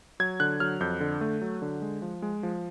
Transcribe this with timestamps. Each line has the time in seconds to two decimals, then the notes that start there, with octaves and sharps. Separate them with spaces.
0.20 F#3 G#6
0.40 D3 F#6
0.60 F#3 F6
0.80 F2 G6
1.01 D3
1.21 A3
1.41 F#3
1.62 D3
1.82 G#3
2.02 F3
2.22 G#3
2.43 F3